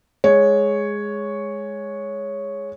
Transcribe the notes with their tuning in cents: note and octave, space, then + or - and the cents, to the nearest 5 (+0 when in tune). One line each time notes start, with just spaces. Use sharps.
G#3 +0 C#5 +0